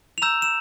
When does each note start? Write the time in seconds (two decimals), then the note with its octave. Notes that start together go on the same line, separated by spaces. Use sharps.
0.18 F7
0.22 A#5 E6 G6 E7
0.42 E7